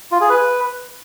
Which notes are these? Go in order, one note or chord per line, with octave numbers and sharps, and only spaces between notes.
F4
G#4
B4